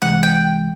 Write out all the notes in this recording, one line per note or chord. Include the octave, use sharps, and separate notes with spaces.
C2 C3 E3 G#3 F#5
G5